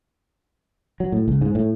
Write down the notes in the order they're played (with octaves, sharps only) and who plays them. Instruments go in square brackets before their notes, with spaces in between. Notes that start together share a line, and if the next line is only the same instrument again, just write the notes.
[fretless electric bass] F#3
A2
C#2
G#2
A2